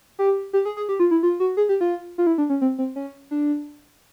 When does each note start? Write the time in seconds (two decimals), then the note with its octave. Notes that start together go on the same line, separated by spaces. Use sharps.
0.19 G4
0.53 G4
0.65 G#4
0.77 G#4
0.89 G4
1.00 F4
1.11 E4
1.23 F4
1.40 F#4
1.57 G#4
1.69 G4
1.81 F4
2.18 F4
2.27 E4
2.38 D4
2.50 C#4
2.61 C4
2.78 C4
2.96 C#4
3.31 D4